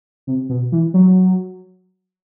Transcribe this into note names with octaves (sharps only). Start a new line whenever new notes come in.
C3
B2
E3
F#3